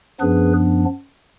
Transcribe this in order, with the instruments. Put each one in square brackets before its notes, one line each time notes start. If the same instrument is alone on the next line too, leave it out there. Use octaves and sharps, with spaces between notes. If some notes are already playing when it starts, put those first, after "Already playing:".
[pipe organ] F#2 F3 B3 D4 G#4 B4